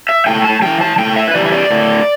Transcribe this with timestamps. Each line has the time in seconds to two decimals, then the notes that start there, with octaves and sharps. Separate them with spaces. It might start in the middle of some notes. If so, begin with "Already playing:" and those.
0.09 E5
0.26 A2 G5
0.45 A5
0.62 E3 G3 G5
0.81 A5
0.98 A2 G5
1.16 E5
1.28 B4
1.34 E3 G3 D5
1.46 E5
1.52 D5
1.71 A2